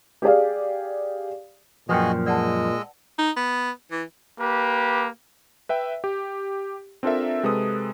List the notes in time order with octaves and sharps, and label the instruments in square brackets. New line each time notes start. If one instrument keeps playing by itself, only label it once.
[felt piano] G4 G#4 D5 F5
[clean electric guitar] F#2 F3 [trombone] A#2 [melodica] F#4 G#4 D#5 [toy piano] B4 G5
[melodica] G#3 D#5 E6 [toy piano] D5 F#5 A5
[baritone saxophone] D#4
B3
E3
[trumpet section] A#3 G4 B4
[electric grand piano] B4 E5 G5
G4
C4 D4 F4 A4 A#4 E5
C3 G#3 A4 B4 D#6